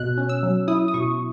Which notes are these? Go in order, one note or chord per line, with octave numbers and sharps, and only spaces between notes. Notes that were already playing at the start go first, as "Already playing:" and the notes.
Already playing: B2 F#6
C#4
E6
F#3
E4 D#6
D#6
B2 C#6